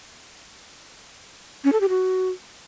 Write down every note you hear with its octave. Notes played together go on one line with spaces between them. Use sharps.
C#4
A4
G4
F#4